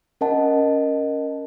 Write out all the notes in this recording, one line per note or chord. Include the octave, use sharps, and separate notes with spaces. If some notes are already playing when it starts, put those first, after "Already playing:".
C#4 A#4 D#5 F#5 A5